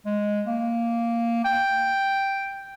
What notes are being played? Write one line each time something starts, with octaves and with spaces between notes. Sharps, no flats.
G#3
A#3
G5